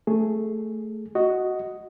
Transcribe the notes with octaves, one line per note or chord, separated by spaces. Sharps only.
A3 G#4
F#4 D#5